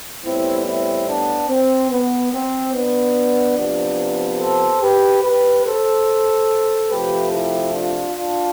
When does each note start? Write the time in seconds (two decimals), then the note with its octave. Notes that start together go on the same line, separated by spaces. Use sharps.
0.24 A2 G3 B3 C4 E4
0.66 C4 E4
1.08 B3 D4
1.49 C4
1.91 B3
2.33 C4
2.74 B3 D4
3.58 C3 F3 B3
4.40 A4 C5
4.81 G4 B4
5.24 G4 B4
5.65 A4 C5
6.90 C3 F3 A3 G4 B4
7.32 E4 G4
7.73 D4 F4
8.15 D4 F4